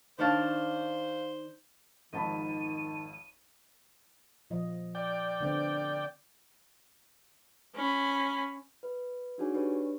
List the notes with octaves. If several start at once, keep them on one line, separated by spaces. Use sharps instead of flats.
D#3 D4 C5 C#5 F5 A5
G#1 F2 G#2 D#3 D#5 A5 B5 D#7
A#2 F3 D#5
D5 G5
D3 B3 C4
C#4 B5
B4
D4 D#4 F#4 G#4 C#5 G#5
D4 G4 B4 C#5